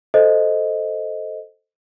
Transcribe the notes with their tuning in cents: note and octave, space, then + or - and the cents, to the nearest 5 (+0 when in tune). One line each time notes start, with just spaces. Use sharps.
A4 +0 C5 +0 D#5 +5